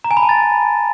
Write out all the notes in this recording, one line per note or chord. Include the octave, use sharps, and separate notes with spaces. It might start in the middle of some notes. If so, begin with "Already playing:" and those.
A#5
G#5
B5
A5
A6